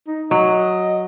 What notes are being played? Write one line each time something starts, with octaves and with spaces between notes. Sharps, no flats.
D#4
F#3 D#5